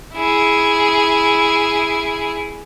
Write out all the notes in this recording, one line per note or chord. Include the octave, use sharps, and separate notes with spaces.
E4 G#4